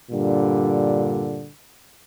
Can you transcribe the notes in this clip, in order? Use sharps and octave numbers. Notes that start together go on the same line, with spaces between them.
G2 A#2 D3 G3